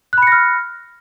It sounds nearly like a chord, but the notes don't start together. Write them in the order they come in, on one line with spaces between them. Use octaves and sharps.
F#6 B5 C#7 A#6 F6